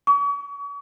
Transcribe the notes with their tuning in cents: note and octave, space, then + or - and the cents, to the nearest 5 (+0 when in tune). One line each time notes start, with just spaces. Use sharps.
C#6 +40